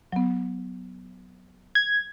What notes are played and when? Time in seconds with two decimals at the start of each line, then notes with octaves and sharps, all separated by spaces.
0.12 F#3 B3
1.75 G#6